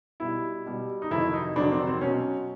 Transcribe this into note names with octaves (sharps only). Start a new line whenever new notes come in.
B2 G3 E4
B2 G3
D#4
F2 C3 D#3 F#3 E4
D#4
F2 C3 D#3 F#3 D4
C4
C4
B2 F#3 C#4